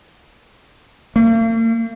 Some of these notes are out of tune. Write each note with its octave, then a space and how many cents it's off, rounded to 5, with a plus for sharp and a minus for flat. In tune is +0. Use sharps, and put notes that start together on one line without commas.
A#3 -45